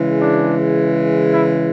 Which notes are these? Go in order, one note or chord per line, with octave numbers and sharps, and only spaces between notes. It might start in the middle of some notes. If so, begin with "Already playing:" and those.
Already playing: C#3 E3 G#3
D4
E4